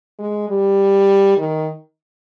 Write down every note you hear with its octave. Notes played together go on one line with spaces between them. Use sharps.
G#3
G3
D#3